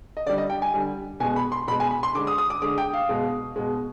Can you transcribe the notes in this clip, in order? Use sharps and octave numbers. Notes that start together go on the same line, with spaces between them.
D#5
D3 G3 D5
D#5
G5
G#5
D3 G3
B2 G#3 G#5
B5
C6
B2 G#3 B5
G#5
B5
C6
D3 G#3 D6
D#6
D#6
D6
D3 G#3 D6
G5
F5
B2 G#3
B2 G#3